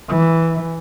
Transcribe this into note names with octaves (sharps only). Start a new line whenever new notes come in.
E3